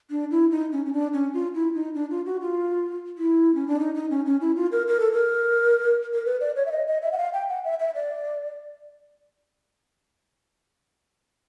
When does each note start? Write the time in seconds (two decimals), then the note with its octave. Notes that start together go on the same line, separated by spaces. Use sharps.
0.11 D4
0.31 E4
0.51 D#4
0.72 C#4
0.85 C#4
0.93 D4
1.13 C#4
1.34 F4
1.54 E4
1.75 D#4
1.95 D4
2.10 F4
2.26 F#4
2.41 F4
3.18 E4
3.55 C#4
3.68 D4
3.80 D#4
3.95 D#4
4.11 C#4
4.26 C#4
4.41 E4
4.56 F4
4.72 A#4
4.87 A#4
5.00 A4
5.12 A#4
6.14 A#4
6.26 B4
6.41 D5
6.56 C#5
6.66 E5
6.72 D#5
6.87 D#5
7.02 E5
7.12 F#5
7.18 F5
7.33 G5
7.49 F#5
7.64 E5
7.80 E5
7.95 D5